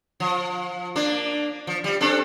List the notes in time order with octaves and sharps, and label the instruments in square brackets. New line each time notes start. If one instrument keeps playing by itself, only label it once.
[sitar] F3
A#3 D4
F3
G3
C4 D4 A4